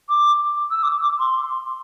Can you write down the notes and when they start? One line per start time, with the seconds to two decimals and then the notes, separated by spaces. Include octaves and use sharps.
0.09 D6
0.71 E6
0.83 D6
1.02 D6
1.19 C6